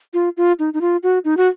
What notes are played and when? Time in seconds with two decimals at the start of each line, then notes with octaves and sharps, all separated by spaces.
0.14 F4
0.37 F4
0.59 D#4
0.74 D#4
0.81 F4
1.03 F#4
1.25 D#4
1.37 F#4